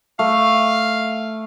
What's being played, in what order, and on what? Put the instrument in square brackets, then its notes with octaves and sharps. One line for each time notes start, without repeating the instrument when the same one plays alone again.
[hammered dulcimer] A3 [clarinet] F5